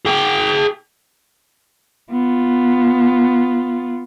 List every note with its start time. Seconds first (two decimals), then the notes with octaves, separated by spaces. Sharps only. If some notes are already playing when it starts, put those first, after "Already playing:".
0.05 G#4 G5
2.12 B3 F4